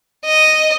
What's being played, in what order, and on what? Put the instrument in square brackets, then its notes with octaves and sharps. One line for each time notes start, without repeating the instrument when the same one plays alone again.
[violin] D#5